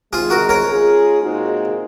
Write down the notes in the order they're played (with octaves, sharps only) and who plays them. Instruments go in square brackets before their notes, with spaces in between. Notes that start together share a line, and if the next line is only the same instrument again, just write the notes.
[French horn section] C3 D#3 G#3 [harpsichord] F4 G#4
[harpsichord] F#4 A#4
A#4 C#5
[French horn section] G#3 C#4 F4 G#4
A#2 G#3 C4 D#4 F#4